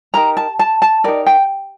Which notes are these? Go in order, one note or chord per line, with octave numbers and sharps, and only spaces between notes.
D#4 G4 A#4 A#5
A5
A5
A5
D#4 G4 A#4 D5
G5